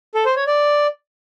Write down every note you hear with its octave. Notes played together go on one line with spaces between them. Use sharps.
A4
C5
C#5
D5